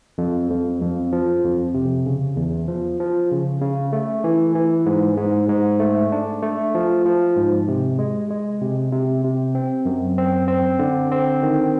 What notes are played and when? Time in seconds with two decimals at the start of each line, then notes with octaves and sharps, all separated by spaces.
0.18 F2
0.50 F2
0.82 F2
1.12 F3
1.44 F2
1.74 C3
2.06 C#3
2.37 E2
2.68 F3
3.00 F3
3.31 C#3
3.61 C#3
3.93 A3
4.24 E3
4.55 E3
4.86 G#2
5.17 G#2
5.49 G#2
5.80 A3
6.12 D4
6.42 A3
6.75 F3
7.06 F3
7.37 G#2
7.68 C3
7.99 G#3
8.31 G#3
8.62 C3
8.92 C3
9.24 C3
9.55 C4
9.85 F#2
10.18 C4
10.48 C4
10.79 D3
11.11 C4
11.43 D#3